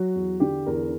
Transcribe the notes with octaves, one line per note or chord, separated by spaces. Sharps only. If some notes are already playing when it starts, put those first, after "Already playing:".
Already playing: F#3 F#4
E2
D3 G4
E2 A#4